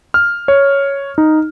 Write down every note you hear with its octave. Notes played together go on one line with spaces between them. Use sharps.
F6
C#5
D#4